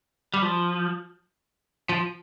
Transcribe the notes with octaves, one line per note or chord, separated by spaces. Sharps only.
G3
F3
F3